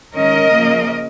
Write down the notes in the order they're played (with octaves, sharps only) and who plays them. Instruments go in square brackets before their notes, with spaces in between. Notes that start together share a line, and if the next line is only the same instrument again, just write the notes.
[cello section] D#3 G#3 C#4 A#4 D#5
C#3 F3 A#3